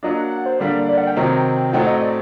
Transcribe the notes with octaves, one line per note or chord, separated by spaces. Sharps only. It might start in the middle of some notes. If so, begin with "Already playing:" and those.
F#3 A#3 D4 D#5
F#5
F#5
C5
D3 G3 A#3 D4 D5
D5
F#5
G5
C3 D#3 F#3 C4 D#4
A2 F#3 A3 C4 D#4 F#5
D#5
D5